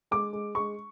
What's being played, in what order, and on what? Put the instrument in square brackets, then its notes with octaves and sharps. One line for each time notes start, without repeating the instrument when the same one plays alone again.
[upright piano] G#3 D6
G#3
G#3 C#6